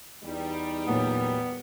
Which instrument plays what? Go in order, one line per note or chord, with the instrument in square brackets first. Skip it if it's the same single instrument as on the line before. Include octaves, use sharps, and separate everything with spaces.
[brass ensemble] E2 G3 [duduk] D#4
[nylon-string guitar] A#2 F#3 F4 [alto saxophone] B3